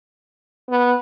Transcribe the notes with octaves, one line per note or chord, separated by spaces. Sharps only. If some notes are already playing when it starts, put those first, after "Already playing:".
B3